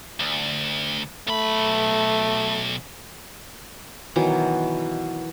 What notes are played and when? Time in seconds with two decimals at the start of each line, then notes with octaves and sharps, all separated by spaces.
0.20 D2
1.28 B1 A3 B5
4.16 B2 D#3 E3 F#3